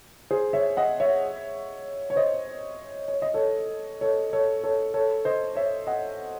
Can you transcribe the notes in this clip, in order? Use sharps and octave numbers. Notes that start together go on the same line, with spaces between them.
G#4 C5
C#5 E5
D#5 F#5
C#5 E5
C#5
C5 D#5
C#5
D#5
A4 C#5
A4 C#5
A4 C#5
A4 C#5
A4 C#5
C5 D#5
C#5 E5
D#5 F#5